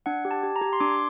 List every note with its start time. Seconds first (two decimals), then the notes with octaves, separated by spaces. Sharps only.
0.06 D4 F#5
0.25 G4
0.31 A5
0.43 G4
0.56 A#5
0.61 G4
0.73 C6
0.80 D4 D6